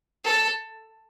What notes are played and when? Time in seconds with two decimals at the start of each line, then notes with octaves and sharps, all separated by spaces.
0.24 A4